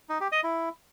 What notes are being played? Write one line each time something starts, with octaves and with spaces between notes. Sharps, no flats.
D#4
G4
D#5
E4